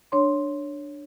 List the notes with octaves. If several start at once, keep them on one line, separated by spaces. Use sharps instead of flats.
D4 C#5 C6